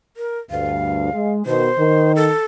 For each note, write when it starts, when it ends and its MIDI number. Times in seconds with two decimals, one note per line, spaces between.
0.17 0.38 70
0.51 1.10 38
0.51 1.10 43
0.51 1.32 77
1.13 1.44 56
1.46 1.70 47
1.46 1.70 51
1.46 2.12 72
1.78 2.30 51
2.16 2.45 69